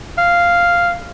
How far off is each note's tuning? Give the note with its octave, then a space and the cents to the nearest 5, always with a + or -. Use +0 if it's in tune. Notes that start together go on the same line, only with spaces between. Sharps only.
F5 -5